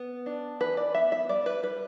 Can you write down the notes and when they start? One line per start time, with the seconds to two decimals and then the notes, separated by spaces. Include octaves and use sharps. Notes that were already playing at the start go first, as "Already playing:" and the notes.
Already playing: B3
0.26 D4
0.60 E3 B4
0.77 D5
0.94 B3 E5
1.12 E5
1.29 G3 D5
1.46 B4
1.63 G3 B4